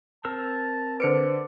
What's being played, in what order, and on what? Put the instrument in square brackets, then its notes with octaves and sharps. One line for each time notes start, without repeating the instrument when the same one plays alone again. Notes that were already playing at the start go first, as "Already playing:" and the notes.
[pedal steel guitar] C4 A#4 E6 [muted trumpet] A5
[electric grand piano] D3 C#7 D7 [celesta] B4 C5 [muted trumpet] D5